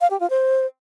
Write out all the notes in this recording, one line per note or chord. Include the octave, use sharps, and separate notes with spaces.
F5
G4
F4
C5